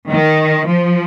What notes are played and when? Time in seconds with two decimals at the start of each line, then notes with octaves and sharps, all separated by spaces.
0.11 D#3
0.67 F3